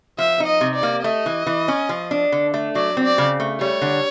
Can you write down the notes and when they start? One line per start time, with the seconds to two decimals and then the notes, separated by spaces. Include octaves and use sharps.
0.18 F3 E5
0.40 D#4
0.46 D#5
0.61 C3
0.76 D5
0.83 A#3
1.04 A3 D#5
1.26 E3
1.47 E3
1.68 C#4
1.89 F3
2.11 D4
2.32 D3
2.54 A3
2.75 F#3 D5
2.97 C4
3.04 D5
3.18 C#3
3.40 A3
3.61 G3 C#5
3.81 D3